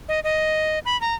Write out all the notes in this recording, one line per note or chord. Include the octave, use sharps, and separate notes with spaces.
D#5
D#5
B5
A#5